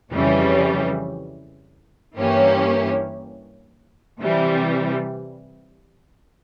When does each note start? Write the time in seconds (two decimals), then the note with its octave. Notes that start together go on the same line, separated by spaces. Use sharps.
0.12 F2 C#3 E3 G3 C#4
2.16 G2 E3 A#3 C#4 G4
4.20 C3 E3 G3